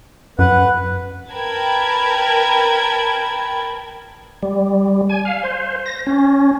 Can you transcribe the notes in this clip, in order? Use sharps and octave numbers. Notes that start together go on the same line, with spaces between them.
F#2 B4 F#5
A#4 B4 G5 A5 B5 G#6
G3
G#5
F5
C5
A#6
C#4